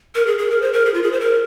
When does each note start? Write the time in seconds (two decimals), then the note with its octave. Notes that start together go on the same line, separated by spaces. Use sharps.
0.15 A#4
0.27 G#4
0.38 G#4
0.51 A#4
0.62 C5
0.73 A#4
0.86 G#4
0.94 F4
1.03 G#4
1.12 C5
1.20 A#4